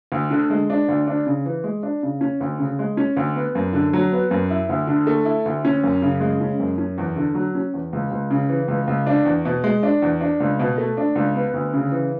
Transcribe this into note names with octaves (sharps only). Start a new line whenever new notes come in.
D2
D3
G#3
D4
D2
D4
C#3
E3
G#3
D4
C#3
C#4
D2
C#3
G#3
C#4
D2
B3
F#2
D3
F#3
B3
F#2
E4
D2
D3
A3
E4
D2
C#4
F#2
C#3
G#3
C#4
F#2
C#4
E2
D3
F#3
C#4
E2
C#2
C#2
C#3
E3
C#2
C#2
D4
E2
B2
G#3
D4
E2
D4
C#2
B2
A3
D4
C#2
B3
D2
C#3
E3